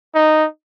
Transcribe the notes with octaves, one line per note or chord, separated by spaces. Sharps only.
D#4